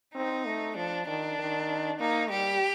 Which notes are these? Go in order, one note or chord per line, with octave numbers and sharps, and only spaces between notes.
C4 D#4
A3
F3 D4
D#3 D4
D#3
A#3 D#4
G3 G4